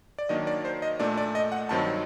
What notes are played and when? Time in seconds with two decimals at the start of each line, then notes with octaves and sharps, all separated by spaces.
0.18 D5
0.29 D#3 F#3 A#3 D4 D#5
0.47 D5
0.65 C5
0.82 D#5
1.00 A#2 A3 D4 D5
1.17 D5
1.35 D#5
1.52 F#5
1.69 G2 D#3 F#3 C4 D#4 A5